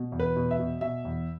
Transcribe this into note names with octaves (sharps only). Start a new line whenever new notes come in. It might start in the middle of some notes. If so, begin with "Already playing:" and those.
Already playing: B2
E2
B4
B2
E5
B2
B2 E5
E2